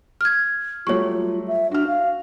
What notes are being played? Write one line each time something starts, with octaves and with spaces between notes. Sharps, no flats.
F6 G#6
F#3 G3 A3 F4 C#5 C#6
E5
D4 F#4 F6
F5